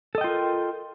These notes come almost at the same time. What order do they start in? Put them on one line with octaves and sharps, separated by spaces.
A4 D#5 G5 F4 A#4